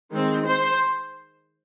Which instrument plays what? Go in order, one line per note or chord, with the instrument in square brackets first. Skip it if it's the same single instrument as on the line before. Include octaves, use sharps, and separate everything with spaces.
[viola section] D#3 G#3 C4
C5